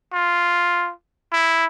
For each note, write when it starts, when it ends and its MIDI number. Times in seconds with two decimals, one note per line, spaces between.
0.13 0.91 65
1.32 1.66 64